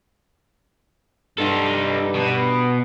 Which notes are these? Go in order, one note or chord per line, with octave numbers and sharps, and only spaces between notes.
G2 D#4 A4
B2